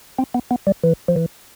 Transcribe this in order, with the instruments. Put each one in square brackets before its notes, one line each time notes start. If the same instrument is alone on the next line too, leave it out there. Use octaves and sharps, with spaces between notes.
[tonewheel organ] C4
B3
B3
G3
E3
F3
E3